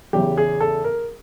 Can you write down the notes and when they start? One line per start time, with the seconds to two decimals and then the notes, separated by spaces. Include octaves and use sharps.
0.13 E2 C#3 E3 G4
0.38 G#4
0.61 A4
0.84 A#4